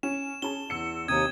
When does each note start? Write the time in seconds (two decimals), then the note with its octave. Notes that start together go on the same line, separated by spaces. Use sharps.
0.03 C#4 E7
0.42 C#4 G#4 A5 G7
0.70 E2 E6 C#7
1.08 D#2 C3 D#6 G#6